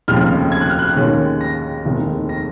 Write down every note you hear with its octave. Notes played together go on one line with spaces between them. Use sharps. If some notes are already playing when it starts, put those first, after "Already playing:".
F1 D#2 C#3 F3 F6
G#6
F#6
F6
F#6
D#2 D#3 G#3 C#4
A#6
F1 D#2 D#3 G#3
A#6